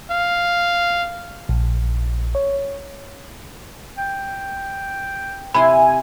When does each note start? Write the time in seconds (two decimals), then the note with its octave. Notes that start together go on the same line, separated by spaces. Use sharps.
0.11 F5
1.49 A#1
2.35 C#5
3.97 G5
5.55 C3 E4 G#5 B5 C6